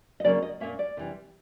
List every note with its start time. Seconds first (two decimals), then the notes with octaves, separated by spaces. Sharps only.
0.20 D#5
0.24 C#3 F#3 A#3 C#4 D5
0.43 D#5
0.60 A#2 F#3 A#3 C#4 E5
0.79 D5
0.97 C3 E3 G3